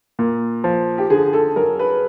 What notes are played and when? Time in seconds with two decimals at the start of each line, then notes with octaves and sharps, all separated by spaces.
0.19 A#2
0.64 F3
0.98 G4
1.10 D3 G#4
1.33 A4
1.56 F#3 A#4
1.79 B4